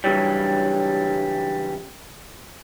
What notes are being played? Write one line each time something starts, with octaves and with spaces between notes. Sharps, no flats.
G2 C#3 E3 F#3 G3